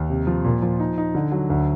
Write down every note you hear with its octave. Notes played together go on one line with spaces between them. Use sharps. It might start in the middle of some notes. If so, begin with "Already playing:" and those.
Already playing: D#2
C3
F3
A#2
F3
D#4
D#4
D3
F#3
D2